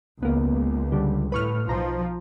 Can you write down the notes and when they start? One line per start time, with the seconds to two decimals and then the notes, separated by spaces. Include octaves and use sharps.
0.23 C#2 A#3 B3
0.92 D3 G3
1.32 A2 B4 C#6 F6
1.68 B1 F3 A#5